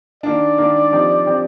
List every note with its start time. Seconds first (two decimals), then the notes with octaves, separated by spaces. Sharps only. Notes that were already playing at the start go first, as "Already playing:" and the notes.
0.23 D#3 A#3 D4 D5
0.58 D#3 A#3 D4
0.92 F3 C4 D#4 G4
1.26 F3 C4 D#4 G4